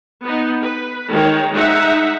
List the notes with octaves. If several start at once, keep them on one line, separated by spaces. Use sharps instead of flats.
B3 D#4
B4
D#3 G#3 C#5
G#3 D#4 E5 F#5